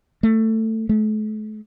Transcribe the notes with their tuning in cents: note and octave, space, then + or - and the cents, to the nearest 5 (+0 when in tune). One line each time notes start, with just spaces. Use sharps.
A3 +15
A3 -40